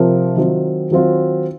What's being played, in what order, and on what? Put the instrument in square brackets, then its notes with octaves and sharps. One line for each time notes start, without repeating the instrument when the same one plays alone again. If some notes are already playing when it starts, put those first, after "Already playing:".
Already playing: [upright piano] C3 F3 C4 F4 A#4
D#3 F#3 C4 F4
D#3 F#3 C4 F4